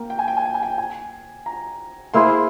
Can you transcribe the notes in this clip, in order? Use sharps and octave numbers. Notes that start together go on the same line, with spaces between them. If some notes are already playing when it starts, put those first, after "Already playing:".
Already playing: A#3 G5 A#5
G5
G#5
G5
G#5
G5
G#5
G5
G#5
A#5
A#3 E4 G#4 C5 C6